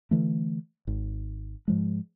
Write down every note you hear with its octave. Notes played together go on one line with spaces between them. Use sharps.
D3 E3 A3
G#1
G#2 F3 G#3